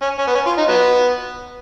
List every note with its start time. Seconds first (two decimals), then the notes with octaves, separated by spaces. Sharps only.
0.02 C#4
0.19 C#4
0.27 B3
0.35 C#4
0.47 F4
0.57 D#4
0.69 F#3 B3